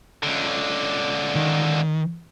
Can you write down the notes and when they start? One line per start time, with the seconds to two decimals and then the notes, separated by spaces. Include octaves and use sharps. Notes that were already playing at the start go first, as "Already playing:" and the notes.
0.23 C#2 D3
1.35 D#3